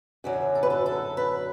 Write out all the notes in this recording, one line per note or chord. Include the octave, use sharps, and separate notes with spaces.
F#2 D3 F#3
A4
B4
A4
A4
B4